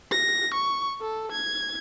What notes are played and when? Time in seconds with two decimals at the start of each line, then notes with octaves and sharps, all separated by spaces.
0.12 A#6
0.54 C#6
1.01 A4
1.32 G#6